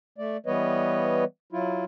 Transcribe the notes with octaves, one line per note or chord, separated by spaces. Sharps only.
A3 D5
E3 G3 B3 B4 C#5 D#5
F#3 E4 F4